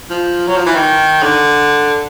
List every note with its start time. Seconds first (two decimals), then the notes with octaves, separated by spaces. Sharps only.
0.10 F3
0.47 F#3
0.56 F3
0.66 E3
0.75 D#3
1.23 D3